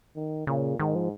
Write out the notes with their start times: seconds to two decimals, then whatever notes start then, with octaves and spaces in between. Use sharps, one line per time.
0.16 D#3
0.47 A#2 C#3
0.79 G#2 D#3
0.95 F3